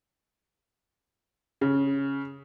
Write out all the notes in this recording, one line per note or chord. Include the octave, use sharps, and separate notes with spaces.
C#3